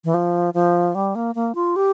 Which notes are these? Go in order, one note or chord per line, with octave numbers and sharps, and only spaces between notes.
E3
F3
F3
G3
A#3
A#3
F4
G4